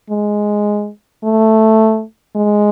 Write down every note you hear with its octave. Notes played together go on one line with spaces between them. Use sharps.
G#3
A3
G#3